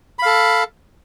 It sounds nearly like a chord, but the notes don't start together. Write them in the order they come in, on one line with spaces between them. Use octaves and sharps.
B5 F5 A4